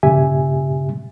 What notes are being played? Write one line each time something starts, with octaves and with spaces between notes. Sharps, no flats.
G2 A#2 C#3 G4 E5 G#5